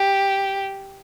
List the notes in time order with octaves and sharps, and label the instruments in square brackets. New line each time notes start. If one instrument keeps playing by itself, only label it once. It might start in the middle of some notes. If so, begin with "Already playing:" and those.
Already playing: [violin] G4